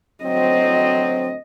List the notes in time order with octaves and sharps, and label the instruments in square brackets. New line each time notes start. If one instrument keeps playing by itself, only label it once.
[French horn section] D2 F#3 C4 [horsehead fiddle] D#5